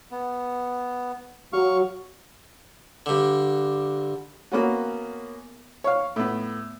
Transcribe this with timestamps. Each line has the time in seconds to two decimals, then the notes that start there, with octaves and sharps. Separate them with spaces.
0.11 B3
1.53 F#3 F5 C#6
3.06 G2 D3
4.52 A#3 B3 C#4 F#4
5.84 C#5 F5
6.16 A2 B3